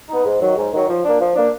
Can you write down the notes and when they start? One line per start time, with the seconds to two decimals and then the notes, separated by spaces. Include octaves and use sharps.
0.09 B3 D#4
0.25 G#2
0.41 D#3 F#3
0.57 G#2
0.73 D#3 F#3
0.89 F3
1.04 A#3 D4
1.20 F3
1.36 A#3 D4